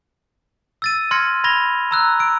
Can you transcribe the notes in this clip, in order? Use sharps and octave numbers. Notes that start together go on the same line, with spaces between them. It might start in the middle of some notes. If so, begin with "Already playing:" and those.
E6 A6 D#7
C6 F6 G#6 A#6 C#7
B5 G#6 A#6 F7 G7
A#5 E6 F#6
E6 D7